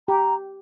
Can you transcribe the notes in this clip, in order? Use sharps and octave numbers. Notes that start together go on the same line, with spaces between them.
G4 A#5